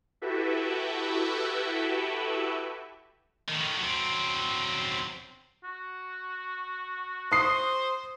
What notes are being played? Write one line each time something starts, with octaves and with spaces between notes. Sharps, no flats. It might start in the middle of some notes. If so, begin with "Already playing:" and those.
E4 F#4 G4 A4 B4 E5
A2 D#3
F#3 C4
F#4
C5 D#6 C7